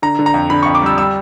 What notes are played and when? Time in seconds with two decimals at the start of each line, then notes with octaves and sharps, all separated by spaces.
0.02 D3 A#5
0.19 D3
0.26 A#5
0.34 F2
0.50 D3 B5
0.63 F2 C#6
0.75 D6
0.82 G3 E6
0.98 G3 E6